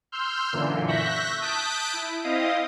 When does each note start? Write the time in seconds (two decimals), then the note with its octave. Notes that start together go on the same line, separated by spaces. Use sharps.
0.12 C6 E6 F6 G6
0.52 F#2 A#2 D3 E3
0.87 E5 C#6 F#6 G6 A#6 B6
1.41 A5 D#6 F#6 G6 B6 D7
1.93 E4
2.23 C4 E4 D#5 F5 D#6